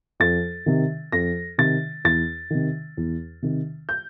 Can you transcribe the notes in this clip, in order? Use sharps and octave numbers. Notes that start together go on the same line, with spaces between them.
F2 A6
C3 D#3
F2 A#6
C3 D#3 A6
E2 A6
C3 D#3
E2
C3 D#3
G6